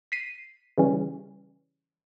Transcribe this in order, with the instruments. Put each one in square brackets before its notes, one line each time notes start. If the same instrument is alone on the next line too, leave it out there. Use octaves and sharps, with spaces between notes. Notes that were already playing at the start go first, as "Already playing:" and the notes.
[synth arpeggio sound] B6 C7 D#7
C#3 E3 G3 C#4